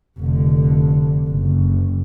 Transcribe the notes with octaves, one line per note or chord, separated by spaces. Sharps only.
F1 D3
F#1